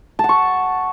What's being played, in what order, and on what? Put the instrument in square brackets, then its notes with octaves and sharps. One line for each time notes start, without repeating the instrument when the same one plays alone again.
[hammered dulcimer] A5
F#5
C#6